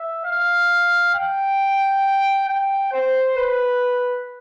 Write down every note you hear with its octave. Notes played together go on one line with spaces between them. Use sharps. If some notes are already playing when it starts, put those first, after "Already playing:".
Already playing: E5
F5
G5
G5
C5
B4